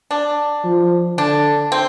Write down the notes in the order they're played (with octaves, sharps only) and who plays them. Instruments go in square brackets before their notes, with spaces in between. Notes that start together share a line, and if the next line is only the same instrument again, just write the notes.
[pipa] D4
[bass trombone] F3
[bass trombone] D3 [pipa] D4
[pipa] C4